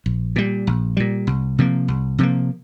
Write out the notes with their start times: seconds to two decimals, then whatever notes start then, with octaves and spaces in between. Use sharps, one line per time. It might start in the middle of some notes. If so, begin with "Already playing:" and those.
0.06 A#1
0.36 A#2 G3
0.67 A#1
0.97 A#2 G3
1.27 C2
1.58 C3 F3 A#3
1.88 C2
2.18 C3 F3 A#3